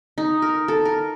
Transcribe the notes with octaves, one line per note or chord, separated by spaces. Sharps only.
D#4
A#4
A4
A#4